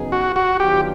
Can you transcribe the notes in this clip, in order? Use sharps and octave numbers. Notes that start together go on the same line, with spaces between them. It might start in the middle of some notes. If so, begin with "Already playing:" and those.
Already playing: C#3 F#3 B3 D#4 G#4
F#4
F#4
D#3 F#3 B3 D4 F4 G4